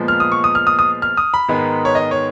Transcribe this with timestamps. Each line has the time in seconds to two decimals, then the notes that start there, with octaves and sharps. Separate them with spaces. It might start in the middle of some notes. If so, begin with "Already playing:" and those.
Already playing: A#2 F3 G#3 B3
0.08 F6
0.20 D#6
0.32 C#6
0.44 D#6
0.55 F6
0.67 D#6
0.79 D#6
1.02 F6
1.17 D#6
1.34 B5
1.48 G#2 D#3 G#3 B3
1.85 C#5
1.95 D#5
2.11 C#5